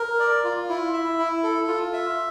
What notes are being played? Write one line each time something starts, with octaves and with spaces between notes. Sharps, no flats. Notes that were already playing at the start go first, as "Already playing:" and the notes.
Already playing: A#4
D5
F4
E4
E5
E4
A4
F4
E5